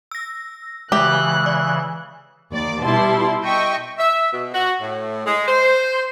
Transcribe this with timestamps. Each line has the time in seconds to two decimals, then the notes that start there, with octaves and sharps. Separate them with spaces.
0.11 E6 A#6
0.92 C#3 E3 G#3 G4 E5 F#6
1.46 D5
2.52 D#2 D5
2.84 B2 G3 E4 A5 C6
3.45 D#5 E5 G5 C#6
3.98 E5
4.32 B2
4.54 F#4
4.81 A2
5.26 G#3
5.48 C5